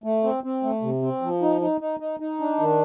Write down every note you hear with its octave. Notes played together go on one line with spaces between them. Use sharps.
A3
C4
C4
A3
C3
C4
F3
D#4
D#4
D#4
D#4
D#4
D4
D#3